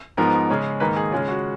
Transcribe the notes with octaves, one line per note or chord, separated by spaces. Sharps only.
G#2 F3 B3 D#4 A#4
C#3 G#3 C#4
G#2 D#3 A#3 D#4 B4
G#4
C#3 G#3 C#4 F4
F#4